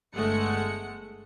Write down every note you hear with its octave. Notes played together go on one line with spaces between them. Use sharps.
G1 G#3 A3 F#5 C#7